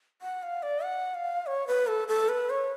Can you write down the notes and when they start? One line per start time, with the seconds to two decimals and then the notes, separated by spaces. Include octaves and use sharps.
0.22 F#5
0.43 F5
0.63 D5
0.84 F#5
1.15 F5
1.46 C#5
1.67 B4
1.87 A4
2.08 A4
2.29 B4
2.50 C#5